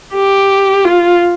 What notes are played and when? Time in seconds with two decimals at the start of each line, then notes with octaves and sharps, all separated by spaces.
0.14 G4
0.84 F4